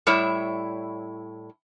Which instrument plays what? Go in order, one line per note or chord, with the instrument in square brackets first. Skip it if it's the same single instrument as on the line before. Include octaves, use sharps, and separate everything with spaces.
[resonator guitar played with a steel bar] A2 G3 E4 C#5 E5